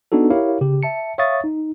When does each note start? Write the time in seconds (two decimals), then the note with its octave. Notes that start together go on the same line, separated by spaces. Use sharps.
0.12 B3 D4 D#4 F#4 A4
0.30 E4 G4 A#4 C#5 F5
0.61 C#3 G4
0.83 E5 A5 C#7
1.18 C#5 E5 F5 C#6 D#6 A6
1.44 D#4